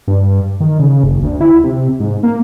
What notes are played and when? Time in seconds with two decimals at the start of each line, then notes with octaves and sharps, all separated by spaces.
0.08 G2
0.60 D#3
0.79 C#3
1.04 F#1
1.23 D2
1.41 E4
1.64 C3
2.00 G#2
2.23 A#3